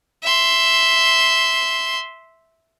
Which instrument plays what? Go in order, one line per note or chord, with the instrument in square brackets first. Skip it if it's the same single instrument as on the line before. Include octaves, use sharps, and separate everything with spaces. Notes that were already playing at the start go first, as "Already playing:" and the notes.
[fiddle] E5 C6